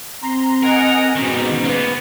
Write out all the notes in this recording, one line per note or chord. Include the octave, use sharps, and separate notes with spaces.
C4 A#5 C6
A#4 D#5 F#5 G#5
G#2 B2 D#3 G3 C#4
A#3 B3 B4